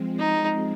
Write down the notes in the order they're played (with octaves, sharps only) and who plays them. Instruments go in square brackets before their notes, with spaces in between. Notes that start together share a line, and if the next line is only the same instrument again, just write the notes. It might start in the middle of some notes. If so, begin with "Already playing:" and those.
Already playing: [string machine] F3 G#3 C4
[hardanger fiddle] D#4